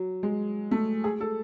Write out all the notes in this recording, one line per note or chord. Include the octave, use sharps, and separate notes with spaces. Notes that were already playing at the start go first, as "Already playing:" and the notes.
Already playing: F#3
G#3
A3
G#4
A4